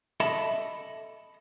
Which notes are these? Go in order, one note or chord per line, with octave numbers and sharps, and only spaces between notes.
A4 D#5 E5 A5 B5